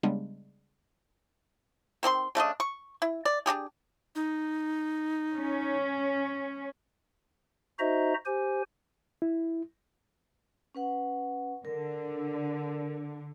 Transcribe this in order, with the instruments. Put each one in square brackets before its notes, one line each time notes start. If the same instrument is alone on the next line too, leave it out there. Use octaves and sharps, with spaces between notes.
[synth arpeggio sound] C#3 G3 G#3 B3 D4
[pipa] D#3 C4 G4 C6
C#3 A3 D4 D#5
C#6
E4
D5
D4 D#4 G4 G#4
[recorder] D#4
[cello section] C#4
[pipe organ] D#4 F#4 C5 D#5 E5 A#5
G4 C5 G#5
[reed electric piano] E4
[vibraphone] C#4 B4 F#5
[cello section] D3 [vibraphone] A#4